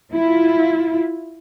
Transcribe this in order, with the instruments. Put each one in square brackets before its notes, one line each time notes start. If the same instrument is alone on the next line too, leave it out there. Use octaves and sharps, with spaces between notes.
[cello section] E4 F4